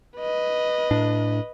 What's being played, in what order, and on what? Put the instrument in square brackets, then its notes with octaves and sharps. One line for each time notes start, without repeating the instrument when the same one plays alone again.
[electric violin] B4 D#5
[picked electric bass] A2 D4